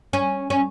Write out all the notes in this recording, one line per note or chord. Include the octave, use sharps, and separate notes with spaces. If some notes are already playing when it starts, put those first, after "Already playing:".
C#4
C#4